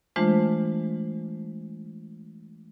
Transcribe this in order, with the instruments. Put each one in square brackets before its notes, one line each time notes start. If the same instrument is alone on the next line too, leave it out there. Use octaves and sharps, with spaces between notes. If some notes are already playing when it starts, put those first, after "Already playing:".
[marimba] E3 G#3 A3 D4 F4 C5